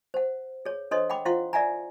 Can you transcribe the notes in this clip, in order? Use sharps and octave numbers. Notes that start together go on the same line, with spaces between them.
C5 F#5
G#4 C#5
D4 A4 C5 C#5 D#5 C6
F#5 G5 B5 D6
E4 F4 C5 F5 F#5 C6
A#4 D5 E5 F#5 G#5 A#5